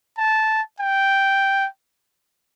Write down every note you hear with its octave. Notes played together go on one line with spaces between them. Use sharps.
A5
G5